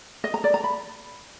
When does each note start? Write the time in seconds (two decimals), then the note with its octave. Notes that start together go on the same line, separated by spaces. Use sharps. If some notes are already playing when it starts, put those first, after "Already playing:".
0.24 D#5
0.34 A#5
0.44 D5
0.54 A#5
0.64 B5